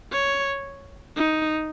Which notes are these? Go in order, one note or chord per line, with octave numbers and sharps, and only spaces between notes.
C#5
D#4